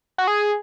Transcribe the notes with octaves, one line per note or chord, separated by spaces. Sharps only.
F#4
G#4